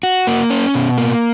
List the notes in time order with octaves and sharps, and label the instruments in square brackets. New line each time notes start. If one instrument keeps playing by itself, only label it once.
[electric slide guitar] F#4
A#3
C#4
B2
A#3